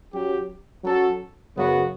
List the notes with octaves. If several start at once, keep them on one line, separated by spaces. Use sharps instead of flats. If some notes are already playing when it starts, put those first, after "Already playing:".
F#3 C#4 G4
F#3 C#4 F#4 A4
F#2 C#3 F#3 B3 F#4